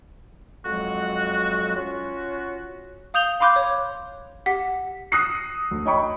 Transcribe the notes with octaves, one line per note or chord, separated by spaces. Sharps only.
F2 F#3 G#3 F#4
C#4 F4 F#4
F5 D#6 G6 F7 G7
F5 B5 C6 D6 F#6 G6
C#5
G4 F#5 B6
D#6 E6 F#6 A#6 C7 C#7
D2
C#5 D#5 G5 B5 C#6